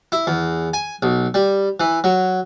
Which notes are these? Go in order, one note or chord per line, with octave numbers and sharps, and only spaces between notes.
E4
E2
G#5
B1
G3
E3
F#3